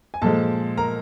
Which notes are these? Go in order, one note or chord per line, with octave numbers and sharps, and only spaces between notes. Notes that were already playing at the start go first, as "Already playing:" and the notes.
G#5
A#2 F3 G#3 A4 A5
A#4 A#5